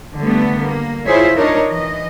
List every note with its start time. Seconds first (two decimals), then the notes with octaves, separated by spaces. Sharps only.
0.18 D3 G3 A3 B3
0.61 A#3
1.05 E4 F4 G#4 C5 C#5 E5
1.36 D4 D#4 A#4 C#5
1.71 E3 D#5